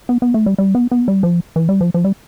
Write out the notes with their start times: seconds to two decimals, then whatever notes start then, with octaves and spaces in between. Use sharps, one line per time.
0.09 B3
0.22 B3
0.34 A3
0.46 G3
0.58 G3
0.75 B3
0.91 B3
1.08 G3
1.23 F3
1.56 E3
1.69 G3
1.81 F3
1.94 F3
2.05 G3